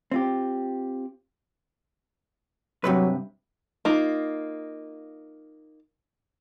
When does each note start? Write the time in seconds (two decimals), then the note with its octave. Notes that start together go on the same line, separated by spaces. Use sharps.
0.12 C4 F4 G4
2.84 G2 C3 F#3 B4
3.85 A#3 D#4 F4